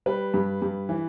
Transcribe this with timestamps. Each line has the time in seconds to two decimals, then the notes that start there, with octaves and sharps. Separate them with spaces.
0.06 G3 B4
0.34 G2
0.62 G2
0.89 E3